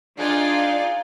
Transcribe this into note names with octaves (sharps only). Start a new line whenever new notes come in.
F3 D4 D#4 F4 G#4 D5